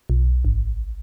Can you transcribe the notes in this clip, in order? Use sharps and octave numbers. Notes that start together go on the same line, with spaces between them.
B1
G#1